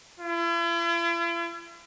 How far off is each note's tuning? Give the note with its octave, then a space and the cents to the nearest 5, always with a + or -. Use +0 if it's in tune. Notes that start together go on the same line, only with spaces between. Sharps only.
E4 +45